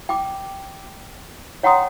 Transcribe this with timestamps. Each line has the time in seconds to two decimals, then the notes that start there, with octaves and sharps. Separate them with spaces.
0.09 G5 D6
1.63 C#5 F#5 G5 A#5 C6 D#6